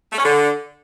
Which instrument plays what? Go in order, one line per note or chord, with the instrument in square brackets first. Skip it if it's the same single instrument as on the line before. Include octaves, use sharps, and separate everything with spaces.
[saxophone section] A3
C#4
D3